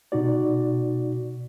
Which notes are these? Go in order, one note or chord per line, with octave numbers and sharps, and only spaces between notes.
B2 D#4 F#4 D5